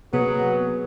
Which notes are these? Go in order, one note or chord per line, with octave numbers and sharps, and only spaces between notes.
C3 F#3 A#3 B3 G#4